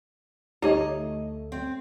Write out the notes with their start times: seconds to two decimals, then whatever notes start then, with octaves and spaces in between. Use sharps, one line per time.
0.62 D2 A3 D#4 G4 C#5 D#5
1.52 C4